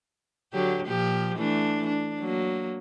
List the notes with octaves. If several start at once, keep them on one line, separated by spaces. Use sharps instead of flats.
D3 F#3 G4
A#2 F3 G4
E3 A3 D4
D4
F#3 A#3